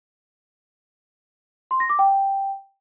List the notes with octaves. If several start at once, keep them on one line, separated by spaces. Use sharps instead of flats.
C6
A#6
D6
G5